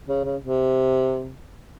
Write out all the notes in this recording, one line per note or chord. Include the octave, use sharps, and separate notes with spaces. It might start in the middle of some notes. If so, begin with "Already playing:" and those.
C#3
C#3
C3